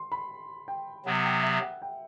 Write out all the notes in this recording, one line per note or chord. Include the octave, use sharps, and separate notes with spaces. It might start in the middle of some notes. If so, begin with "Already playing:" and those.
Already playing: C6
B5
G5
C3 F#3 B3 F#5
G5
E5
F#5
G5